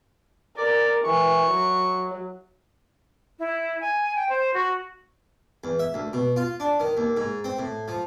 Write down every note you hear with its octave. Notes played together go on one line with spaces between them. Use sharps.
A#4 D5
E3 C#6
F#3
E4
G#5
G5
C5
F#4
E2
E5
D2
B2
F4
D4
D#3
D#2
G#2
C4
A2
F3